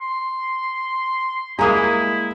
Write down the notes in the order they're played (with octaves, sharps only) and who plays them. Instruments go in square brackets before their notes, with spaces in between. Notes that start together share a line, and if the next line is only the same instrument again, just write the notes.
[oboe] C6
[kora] G#3 A#3 G#4 [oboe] E4 [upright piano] A#5 D#6